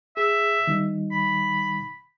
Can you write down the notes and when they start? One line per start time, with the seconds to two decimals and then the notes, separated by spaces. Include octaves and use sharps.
0.17 G#4 E5
0.67 D#3 G3 D#4
1.12 B5